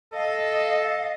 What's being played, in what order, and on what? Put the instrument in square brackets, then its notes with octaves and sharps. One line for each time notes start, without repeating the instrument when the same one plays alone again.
[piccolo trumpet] A4 [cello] D#5 [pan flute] F5